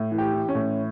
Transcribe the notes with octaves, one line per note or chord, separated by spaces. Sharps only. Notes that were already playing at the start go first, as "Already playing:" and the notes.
Already playing: A2
E3
G4
E3
C#4
A2